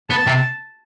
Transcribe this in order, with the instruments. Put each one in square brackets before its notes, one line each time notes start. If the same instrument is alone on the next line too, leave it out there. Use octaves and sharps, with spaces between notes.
[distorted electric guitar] B3 [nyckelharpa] A5
[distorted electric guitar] C3